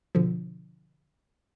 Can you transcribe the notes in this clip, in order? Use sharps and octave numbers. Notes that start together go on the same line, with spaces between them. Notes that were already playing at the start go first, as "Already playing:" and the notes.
B2 D3 F3